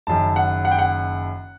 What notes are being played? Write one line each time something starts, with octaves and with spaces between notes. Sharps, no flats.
F#1 F#2 D#3 A5
F#5
F#5
G5
F#5